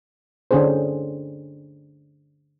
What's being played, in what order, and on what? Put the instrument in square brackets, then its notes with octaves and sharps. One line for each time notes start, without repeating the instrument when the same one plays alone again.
[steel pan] D3 C#4 D4 G#4 C5